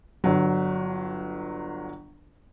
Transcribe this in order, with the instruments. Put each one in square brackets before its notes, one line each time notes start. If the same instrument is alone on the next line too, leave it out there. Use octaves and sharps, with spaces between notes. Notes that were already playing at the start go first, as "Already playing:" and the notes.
[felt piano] G1 F#3